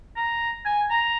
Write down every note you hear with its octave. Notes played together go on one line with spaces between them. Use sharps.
A#5
G#5
A#5